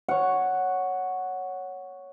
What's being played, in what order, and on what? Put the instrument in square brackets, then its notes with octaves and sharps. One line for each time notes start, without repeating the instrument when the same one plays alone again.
[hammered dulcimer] C#5 F#5